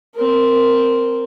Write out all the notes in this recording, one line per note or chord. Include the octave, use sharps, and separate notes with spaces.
C4 A#4